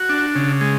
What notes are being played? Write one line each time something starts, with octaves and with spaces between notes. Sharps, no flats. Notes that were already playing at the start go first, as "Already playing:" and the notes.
Already playing: F#4
D4
C#3
G#3